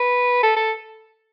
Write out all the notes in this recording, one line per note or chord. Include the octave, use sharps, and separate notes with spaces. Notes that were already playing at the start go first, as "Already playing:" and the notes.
Already playing: B4
A4
A4